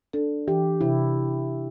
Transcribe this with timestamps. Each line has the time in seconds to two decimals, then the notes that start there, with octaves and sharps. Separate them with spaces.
0.13 D4 A4
0.48 E3 G4
0.81 C3 E4